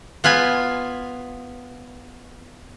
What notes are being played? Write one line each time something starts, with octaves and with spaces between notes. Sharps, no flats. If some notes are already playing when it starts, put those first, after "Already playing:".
B3 F4 B4 G#5